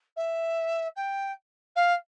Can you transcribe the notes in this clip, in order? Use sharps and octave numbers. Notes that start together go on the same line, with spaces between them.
E5
G5
F5